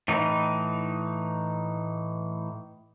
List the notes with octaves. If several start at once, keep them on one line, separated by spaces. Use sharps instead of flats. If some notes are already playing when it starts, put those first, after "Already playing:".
A2 E3 D#4